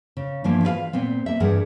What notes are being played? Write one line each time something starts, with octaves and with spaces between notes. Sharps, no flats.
C#3
G2 E3 F3 A#3 B3
F4 F#4 B4 C#5 F5
A#2 B3 C4
A#3 E5
G2 E3 G#4 A#4 F#5